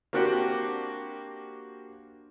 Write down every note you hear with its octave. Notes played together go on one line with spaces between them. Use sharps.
A#3 C4 D4 F#4 G4